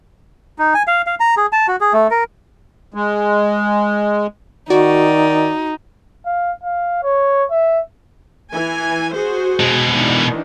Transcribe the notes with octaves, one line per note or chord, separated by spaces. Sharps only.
D#4
G#5
F5
F5
A#5
G#4
A5
F#4
G#4
A3
A#4
G#3
D#3 D#4 F#4 D5
F5
F5
C#5
E5
E3 G#5
F#4 G#4 C5
B2 G#3
D#3 E3 D4